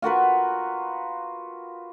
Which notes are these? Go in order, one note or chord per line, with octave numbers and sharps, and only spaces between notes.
F4 F#4 A#4 B4